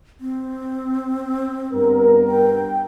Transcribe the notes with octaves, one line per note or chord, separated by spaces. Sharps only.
C4
G2 B3 A#4
G5